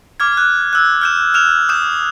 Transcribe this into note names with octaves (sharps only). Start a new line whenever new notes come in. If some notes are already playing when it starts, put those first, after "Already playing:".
D6 F6 G#6
F#6
E6 F#6
F6 G6 E7
F6 E7 F7
D#6 G6 E7